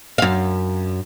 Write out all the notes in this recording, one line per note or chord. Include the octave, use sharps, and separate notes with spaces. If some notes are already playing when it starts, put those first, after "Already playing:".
F#2 F5